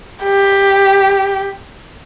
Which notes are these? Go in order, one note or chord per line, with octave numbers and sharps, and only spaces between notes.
G4